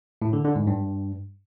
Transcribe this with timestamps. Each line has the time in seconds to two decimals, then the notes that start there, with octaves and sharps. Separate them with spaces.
0.22 A2
0.33 D3
0.44 D3
0.56 G#2
0.67 G2